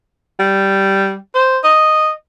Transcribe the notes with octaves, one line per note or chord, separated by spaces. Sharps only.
G3
C5
D#5